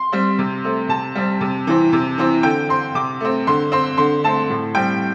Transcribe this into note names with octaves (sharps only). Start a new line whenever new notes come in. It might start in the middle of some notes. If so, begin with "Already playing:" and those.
Already playing: C6
G3 C4
C3
A3 C4
C3 A5
G3 C4
C3
E3 C4
C3
E3 C4
D3 G5
C4 C6
C3 D6
A3 C4
D3 C6
C4 C6
D3 C6
A3 C4 A5
A2
G3 C4 G5